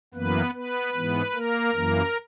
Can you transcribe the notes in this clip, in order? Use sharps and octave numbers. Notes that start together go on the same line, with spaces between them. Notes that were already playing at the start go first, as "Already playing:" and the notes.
F#2 E3 A#3 B3 B4
B3 B4
G#2 E3 B3
A#3 A#4
F#2 E3 A#3